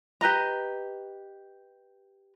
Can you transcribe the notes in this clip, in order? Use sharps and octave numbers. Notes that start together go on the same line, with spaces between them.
G4 B4 D#5 A#5